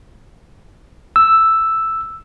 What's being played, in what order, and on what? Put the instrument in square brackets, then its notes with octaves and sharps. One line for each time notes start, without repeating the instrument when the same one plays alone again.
[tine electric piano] E6